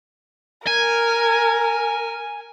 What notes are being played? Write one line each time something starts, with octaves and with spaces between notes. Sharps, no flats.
A#4 G#5